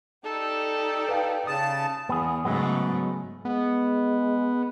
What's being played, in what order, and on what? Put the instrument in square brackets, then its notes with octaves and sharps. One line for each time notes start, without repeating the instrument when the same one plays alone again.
[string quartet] D#4 G4 D5 [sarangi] A4
[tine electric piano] B4 F5 G5
[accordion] C#3 A5 [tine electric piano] D#6
[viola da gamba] E2 [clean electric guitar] B3 G#4
[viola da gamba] G#2 C#3 A3 [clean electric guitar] F#3 G#3 B3
[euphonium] G#3 [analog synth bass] B3